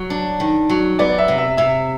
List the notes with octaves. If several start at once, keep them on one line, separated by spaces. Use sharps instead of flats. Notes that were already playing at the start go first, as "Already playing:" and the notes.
Already playing: F#3
D4
D#3
F#3
B3 D5
E5
C3
E5
C3 E5